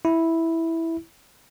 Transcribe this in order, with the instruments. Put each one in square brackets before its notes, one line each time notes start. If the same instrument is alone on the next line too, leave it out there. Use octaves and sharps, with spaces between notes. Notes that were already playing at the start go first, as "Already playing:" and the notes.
[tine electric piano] E4